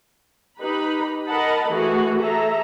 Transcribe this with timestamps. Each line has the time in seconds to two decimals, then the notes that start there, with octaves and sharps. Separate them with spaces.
0.59 D#4 G4 B4 B5
1.27 A#4 D#5 F#5 A5 B5
1.68 E3 A3 F#4 G#4
2.20 G#4 A4 E5 A#5